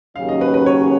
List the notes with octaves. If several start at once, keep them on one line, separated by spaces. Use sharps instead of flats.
D#2 C#3 F#3 C#4 F5
D#5
B4
B4
C#5